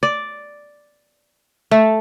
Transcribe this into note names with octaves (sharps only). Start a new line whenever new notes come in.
D5
A3